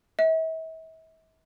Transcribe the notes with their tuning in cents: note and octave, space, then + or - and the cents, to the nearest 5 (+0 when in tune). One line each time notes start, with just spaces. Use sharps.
E5 -40